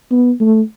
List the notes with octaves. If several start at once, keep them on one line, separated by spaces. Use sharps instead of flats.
B3
A3